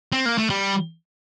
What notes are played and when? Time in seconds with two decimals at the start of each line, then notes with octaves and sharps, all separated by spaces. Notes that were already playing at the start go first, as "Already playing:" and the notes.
0.12 C4
0.26 A#3
0.38 A3
0.50 G3